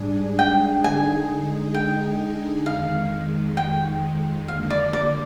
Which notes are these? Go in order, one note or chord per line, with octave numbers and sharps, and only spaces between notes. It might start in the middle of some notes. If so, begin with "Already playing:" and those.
Already playing: G#2 G3 D4 G#4
G5
D3 G#3 D#4 G#4 G#5
G5
F2 D#3 G#3 F5
G5
D3 F3 A#3 F5
D5
D5